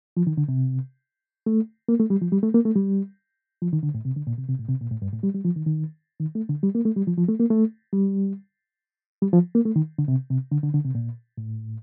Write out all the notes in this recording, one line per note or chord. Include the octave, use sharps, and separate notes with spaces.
F3
D#3
D3
C3
A3
A#3
A3
G3
F3
G3
A3
A#3
A3
G3
F3
D#3
D3
A2
C3
D3
A#2
C3
C3
A2
C3
A#2
A2
G2
A2
G3
G3
F3
D#3
D#3
D#3
A3
D3
G3
A#3
A3
G3
F3
F3
A3
A#3
A3
G3
G3
F3
A#3
A3
D#3
D3
C3
C3
D3
D3
D3
C3
A#2
A2